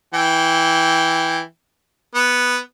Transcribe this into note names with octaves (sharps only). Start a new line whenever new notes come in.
E3 G5
B3